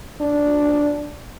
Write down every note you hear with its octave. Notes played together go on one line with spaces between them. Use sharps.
D4